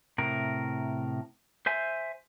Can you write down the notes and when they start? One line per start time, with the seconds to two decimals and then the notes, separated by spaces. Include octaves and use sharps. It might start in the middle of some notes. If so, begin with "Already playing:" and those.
0.18 A2 C3 A#4
1.66 C5 E5 G#5